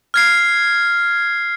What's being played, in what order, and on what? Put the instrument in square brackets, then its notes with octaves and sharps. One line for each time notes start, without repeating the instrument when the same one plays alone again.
[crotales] F6 G#6 C7